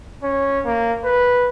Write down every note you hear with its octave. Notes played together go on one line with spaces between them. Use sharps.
C#4
A#3
B4